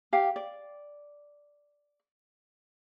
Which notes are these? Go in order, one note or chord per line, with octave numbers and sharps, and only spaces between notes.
G4 F5
D5